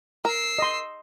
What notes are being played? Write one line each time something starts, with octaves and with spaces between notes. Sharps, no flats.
A#4 E6 C7
D#5 C6